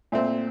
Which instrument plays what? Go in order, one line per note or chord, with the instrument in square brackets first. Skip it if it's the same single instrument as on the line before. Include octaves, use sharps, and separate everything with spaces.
[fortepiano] A#2 A3 C4